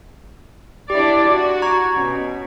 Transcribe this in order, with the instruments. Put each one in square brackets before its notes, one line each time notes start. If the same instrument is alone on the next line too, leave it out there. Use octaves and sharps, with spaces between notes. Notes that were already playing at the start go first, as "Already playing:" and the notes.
[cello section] D4 E4 D5 [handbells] G4
[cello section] F#4
[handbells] A#5 C#6 G#6
[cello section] B2 [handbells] C#4